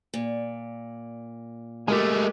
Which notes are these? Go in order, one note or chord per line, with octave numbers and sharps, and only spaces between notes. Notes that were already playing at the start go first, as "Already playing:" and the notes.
A#2
G#3 A3 G4 A#4 G#5